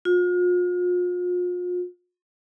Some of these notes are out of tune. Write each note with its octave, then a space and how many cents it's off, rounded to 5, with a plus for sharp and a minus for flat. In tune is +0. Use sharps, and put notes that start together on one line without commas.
F4 +40